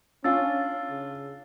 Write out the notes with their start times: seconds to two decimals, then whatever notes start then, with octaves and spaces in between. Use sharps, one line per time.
0.24 C#4 D4 F4 E6 A6
0.90 C#3